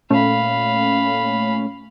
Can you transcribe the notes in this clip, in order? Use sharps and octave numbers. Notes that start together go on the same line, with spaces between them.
A#2 A3 C#4 F5 B5